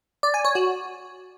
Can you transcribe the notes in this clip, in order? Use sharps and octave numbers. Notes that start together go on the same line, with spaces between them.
D5
G#5
C#5
F#4